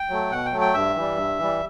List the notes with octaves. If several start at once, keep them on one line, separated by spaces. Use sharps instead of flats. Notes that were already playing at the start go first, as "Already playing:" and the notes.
Already playing: G5
F#3 A3
B2 F#5
G5
F#3 A3
G5
G2 E5
E3 G3
G2
E3 G3